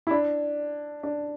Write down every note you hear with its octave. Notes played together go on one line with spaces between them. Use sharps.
E4
D4
D4